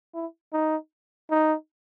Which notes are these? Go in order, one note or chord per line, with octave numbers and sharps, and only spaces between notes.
E4
D#4
D#4